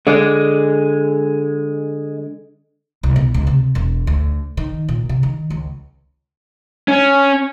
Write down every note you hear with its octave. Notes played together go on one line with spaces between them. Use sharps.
D3 G#3 D5
C2
B2
C#2
C3
E1
D2
D#3
A#2
C3
D#3
C#2
C#4